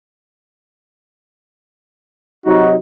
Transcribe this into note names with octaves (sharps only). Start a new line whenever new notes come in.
C3 F#3 D#4 F#4